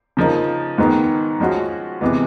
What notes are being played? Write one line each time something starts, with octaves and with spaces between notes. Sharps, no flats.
C#3 F3 A#3 D#4
G#2 D#3 G#3 B3
F3 G#3 C#4 F#4
C3 E3 G#3 B3